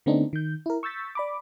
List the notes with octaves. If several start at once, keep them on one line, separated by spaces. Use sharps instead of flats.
D3 A3 B3 C4 D4 D#4
D#3 G6
E4 A#4
C#6 E6 G6 A6 B6
D5 B5 D6